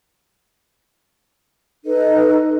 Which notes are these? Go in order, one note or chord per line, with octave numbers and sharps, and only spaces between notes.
D#4 A4 B4 D#5